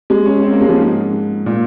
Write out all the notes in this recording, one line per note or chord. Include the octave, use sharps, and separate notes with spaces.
G#3
C#4
C4
A#3
G#3
F3
G#2
A#2